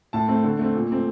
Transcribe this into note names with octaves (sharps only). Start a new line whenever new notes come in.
A2 A5
A3 C4
D3
A3 C4
A#2
A3 C4